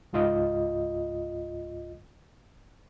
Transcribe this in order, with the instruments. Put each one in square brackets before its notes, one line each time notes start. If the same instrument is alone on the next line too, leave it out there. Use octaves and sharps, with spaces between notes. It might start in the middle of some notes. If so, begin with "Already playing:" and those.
[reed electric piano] C#2 G#2 F4 D#5